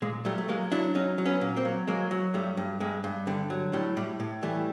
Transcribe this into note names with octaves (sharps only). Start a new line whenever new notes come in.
A#2 G#3
F#3 G3 A3
A3
F#3 G#3 A#3
F#3 D4 E4
F#3 C#4 D#4
F#3
B3 C#4
A#2
A#3 C4
F#3
F#3 G#3 A#3
F#3
G2 G3 A3
G2
G2 G#3
G2
D3 G3
F#3
A2 G3
A2 G3
A2
E3 G3 A3